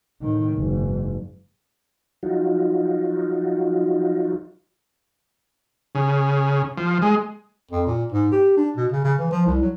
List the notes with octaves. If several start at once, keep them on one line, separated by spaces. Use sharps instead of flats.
A2 D#3
F#1 G#2
F3 F#3 D#4 F4 F#4
C#3
F3
G#3
F2
A#2
G#2
G4
D4
B2
C#3
C#3
E3
F3
C2
F#3